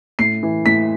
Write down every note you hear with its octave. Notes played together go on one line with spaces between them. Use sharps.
A2 C7
E3
A2 B6